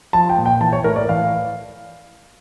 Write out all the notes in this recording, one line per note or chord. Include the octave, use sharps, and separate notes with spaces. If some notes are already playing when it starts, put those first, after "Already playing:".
F3 A5
G5
A#2
G5
E3 A5
C#5
A2 A#4
D5
E3 F5